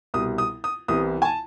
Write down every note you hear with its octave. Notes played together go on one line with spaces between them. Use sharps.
C2 B2 G3 D#6
D#6
D#6
C2 C3 E3 G3 B3 D#6
G#5
A5